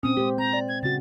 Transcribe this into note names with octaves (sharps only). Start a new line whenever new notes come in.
A#2 C4 C#4 D#6
G#3 G4 C5
C4 A#5 G6
D5
G#6
C#3 F#4 A6